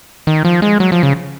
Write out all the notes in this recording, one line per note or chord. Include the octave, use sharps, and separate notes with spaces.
D#3
F3
G#3
F#3
F3
C#3